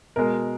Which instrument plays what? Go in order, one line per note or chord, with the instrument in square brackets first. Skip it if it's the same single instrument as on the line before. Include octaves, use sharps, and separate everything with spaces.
[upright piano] B2 G#3 A#4